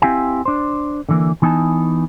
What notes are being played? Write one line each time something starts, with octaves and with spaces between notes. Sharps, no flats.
C4 E4 G4 F5 G#5
D4 C5
D3 E3 A#3
E3 B3 D#4 G#5 A5